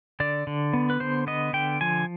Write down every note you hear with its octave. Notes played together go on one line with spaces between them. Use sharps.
D3 D5
D3
B3
B4
D3 C5
B3 D#5
D3 G5
F3 G#5